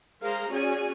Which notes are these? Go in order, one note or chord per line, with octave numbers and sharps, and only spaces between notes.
G#3 G#4 A#4 C5 F5 A#5
C#4 F#4 G#4 C#5 D5 G#5